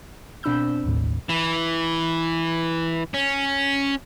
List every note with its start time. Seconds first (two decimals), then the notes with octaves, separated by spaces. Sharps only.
0.43 B2 C4 D4 B5 E6 G6
0.84 A1 D#2 A2
1.29 E3
3.14 C#4